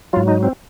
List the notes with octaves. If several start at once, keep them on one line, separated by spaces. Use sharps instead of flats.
G#2 F#3 F4
D#4
C4